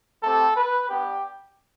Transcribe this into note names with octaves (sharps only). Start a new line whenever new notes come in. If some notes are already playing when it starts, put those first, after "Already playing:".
A3 C4 G4 A4
B4
G3 B3 D4 G4